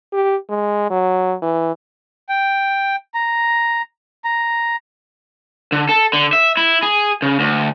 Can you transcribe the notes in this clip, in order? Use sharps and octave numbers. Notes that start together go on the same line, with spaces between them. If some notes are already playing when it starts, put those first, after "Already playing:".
G4
G#3
F#3
E3
G5
A#5
A#5
D3
A4
D3
E5
E4
G#4
C#3
D2